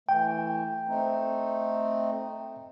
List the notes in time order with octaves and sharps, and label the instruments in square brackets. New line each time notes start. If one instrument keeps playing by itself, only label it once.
[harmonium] E3 A3 [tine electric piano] G5
[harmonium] A3 C4 D#4